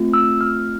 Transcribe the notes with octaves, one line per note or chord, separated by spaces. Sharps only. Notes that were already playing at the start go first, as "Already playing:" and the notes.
Already playing: A3 C4 F4
E6
F6